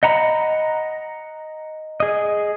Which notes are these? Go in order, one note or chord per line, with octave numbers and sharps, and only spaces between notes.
D#5 F#5 A#5 B5
G#4 D#5